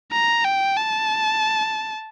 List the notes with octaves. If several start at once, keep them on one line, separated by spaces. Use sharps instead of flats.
A#5
G5
A5